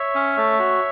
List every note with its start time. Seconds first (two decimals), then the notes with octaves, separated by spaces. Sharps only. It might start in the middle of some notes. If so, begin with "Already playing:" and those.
Already playing: C#5 E5
0.15 C#4
0.37 A3
0.59 F#4